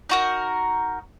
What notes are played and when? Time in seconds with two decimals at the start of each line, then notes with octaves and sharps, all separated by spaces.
0.09 D#4 F#4 A#4